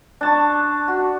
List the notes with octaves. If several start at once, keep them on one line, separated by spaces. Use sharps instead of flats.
D4 A5 C#6
F#4